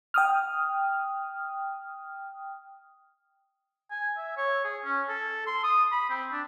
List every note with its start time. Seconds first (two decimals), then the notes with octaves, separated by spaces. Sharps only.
0.14 G5 D#6 F6
3.91 G#5
4.17 E5
4.37 C#5
4.64 G#4
4.84 C#4
5.09 A4
5.47 C6
5.63 D#6
5.92 B5
6.10 C4
6.32 D4